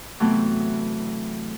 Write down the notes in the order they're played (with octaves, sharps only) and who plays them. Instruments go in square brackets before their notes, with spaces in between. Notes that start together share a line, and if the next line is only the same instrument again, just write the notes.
[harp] C3 E3 F#3 A3 B3 C4